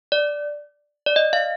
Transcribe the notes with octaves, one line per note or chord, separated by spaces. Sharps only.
D5
D5
D#5
F5